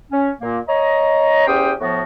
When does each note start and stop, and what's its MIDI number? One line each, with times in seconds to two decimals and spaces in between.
0.11 0.29 61
0.41 0.58 46
0.41 0.58 58
0.68 1.45 73
0.68 1.45 75
0.68 1.45 82
1.46 1.72 40
1.46 1.72 61
1.46 1.72 67
1.46 1.72 72
1.46 1.72 79
1.46 1.72 87
1.80 2.02 45
1.80 2.02 53
1.80 2.02 59
1.80 2.02 66